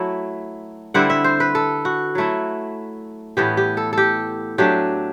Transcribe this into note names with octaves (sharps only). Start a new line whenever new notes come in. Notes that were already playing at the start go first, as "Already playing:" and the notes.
Already playing: F#3 A3 E4
D3 G3 C4 E4 F#5
E5
C5
B4
A4
F#4
F#3 A3 E4
A2 E3 B3 G4
G4
A4
G4 A4
F#3 A3 D4 G4